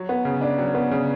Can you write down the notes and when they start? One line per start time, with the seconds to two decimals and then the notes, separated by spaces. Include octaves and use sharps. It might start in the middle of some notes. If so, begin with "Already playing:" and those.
Already playing: F#3 F#4
0.09 B3
0.25 C#3
0.41 D4
0.58 F#3
0.75 B3
0.91 C#3